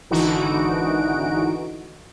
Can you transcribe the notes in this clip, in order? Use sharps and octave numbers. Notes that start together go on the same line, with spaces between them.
G#1 D3 E3 D#4 F#4 D7